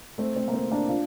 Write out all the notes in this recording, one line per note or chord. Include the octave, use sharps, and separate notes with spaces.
A3 C4
A3 C4
A#3
A3 C4
A#3 D4
D4 F4